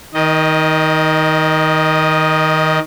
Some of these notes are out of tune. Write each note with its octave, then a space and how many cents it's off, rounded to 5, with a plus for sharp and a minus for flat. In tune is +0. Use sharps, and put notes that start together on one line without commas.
D#3 +20 D#5 -10